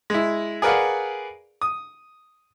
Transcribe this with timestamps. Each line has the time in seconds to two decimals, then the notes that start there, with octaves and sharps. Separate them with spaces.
0.10 G#3 E4
0.62 G#4 A#4 B4 D5 F5 F#5
1.61 D#6